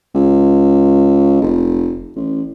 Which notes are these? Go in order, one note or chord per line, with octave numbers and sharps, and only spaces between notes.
C#2
F1
A1